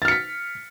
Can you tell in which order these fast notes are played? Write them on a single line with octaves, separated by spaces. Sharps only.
A6 F6 C#7 B6